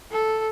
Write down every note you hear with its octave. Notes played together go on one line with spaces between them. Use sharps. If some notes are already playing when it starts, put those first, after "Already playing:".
A4